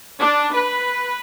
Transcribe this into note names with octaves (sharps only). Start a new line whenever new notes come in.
D4
B4